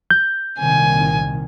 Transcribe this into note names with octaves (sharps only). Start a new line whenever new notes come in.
G6
C2 A#2 D#3 G#5